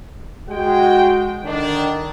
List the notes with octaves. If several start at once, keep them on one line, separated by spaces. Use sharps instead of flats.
G#3 F#4 G5
D3 D#3 D4